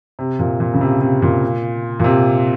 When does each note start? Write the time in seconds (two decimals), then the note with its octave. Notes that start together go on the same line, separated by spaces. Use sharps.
0.19 C3
0.39 A#2
0.60 A#2
0.74 C#3
0.81 C3
1.01 C3
1.22 A#2
2.00 A#2
2.04 C3